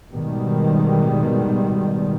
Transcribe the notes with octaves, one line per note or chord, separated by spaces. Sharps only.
G#2 B2 D#3 G3